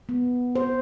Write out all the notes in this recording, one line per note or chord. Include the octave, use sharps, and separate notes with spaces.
B3
C5